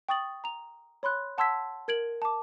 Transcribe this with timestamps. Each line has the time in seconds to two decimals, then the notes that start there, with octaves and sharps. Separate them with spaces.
0.09 G5 C#6 D#6 A6 F#7
0.44 A#5 F7
1.03 C#5 B5 C6 F#6
1.38 F#5 A5 C6 E6 G#6 B6
1.88 A#4 G#6 D7 F#7
2.22 A5 D6